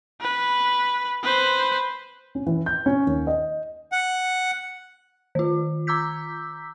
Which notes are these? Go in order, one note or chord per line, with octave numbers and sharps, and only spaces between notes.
B4
B4 C5
C#4
E3
G6
C#4
D#2
D#5
F#5
D#3 F4
A#5 D6 E6 G6 B6